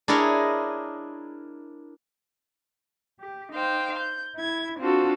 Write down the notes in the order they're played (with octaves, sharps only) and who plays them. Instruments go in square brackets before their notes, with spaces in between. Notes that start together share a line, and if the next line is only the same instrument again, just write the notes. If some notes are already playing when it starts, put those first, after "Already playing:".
[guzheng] D4 E4 G#4 A#4 C#5 D#5
[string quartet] G4
D#4 C5 F5 G5
G6
E4 G#6
C4 D4 F4 F#4 A4